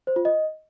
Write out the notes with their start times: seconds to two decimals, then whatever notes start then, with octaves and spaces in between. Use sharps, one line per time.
0.07 C5
0.16 F4
0.25 D#5